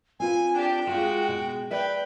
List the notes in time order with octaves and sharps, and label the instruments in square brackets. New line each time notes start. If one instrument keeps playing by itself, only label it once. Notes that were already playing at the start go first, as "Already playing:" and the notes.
[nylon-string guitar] C4 F4 B4 [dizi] G#5
[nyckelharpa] D4 G4 [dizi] G5
[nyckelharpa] G#3 F#4 [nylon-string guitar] F4 F5
[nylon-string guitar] B2
[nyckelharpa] B4 G5 [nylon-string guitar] D5 E5